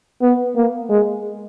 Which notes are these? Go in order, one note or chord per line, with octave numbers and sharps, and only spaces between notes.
B3
A#3
G#3